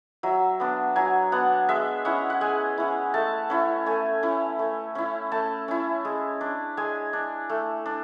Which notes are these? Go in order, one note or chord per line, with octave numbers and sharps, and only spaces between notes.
F#3 E5
B3 D4
F#3 G#5
B3 D4 F#5
G#3 E5
C#4 E4 F#5
F#5
G#3 G#5
C#4 E4
A3 A5
C#4 E4
A3 G#5
C#4 E4
A3
C#4 E4
A3 A5
C#4 E4
G#3
D4
G#3 G#5
D4
A3
D4